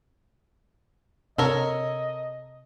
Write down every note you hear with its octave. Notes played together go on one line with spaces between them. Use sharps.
C3 A4 A#4 C#5 D#5